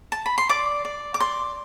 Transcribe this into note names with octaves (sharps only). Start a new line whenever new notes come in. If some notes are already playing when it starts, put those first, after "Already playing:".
A5
B5
C6
D5 D6
D5
D6
D5 C6